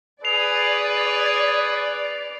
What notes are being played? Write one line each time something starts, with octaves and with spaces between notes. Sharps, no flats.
G#4 B4 D5 C7 F7